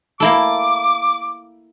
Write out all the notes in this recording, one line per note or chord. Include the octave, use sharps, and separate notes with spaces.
A#3 E4 A4 D6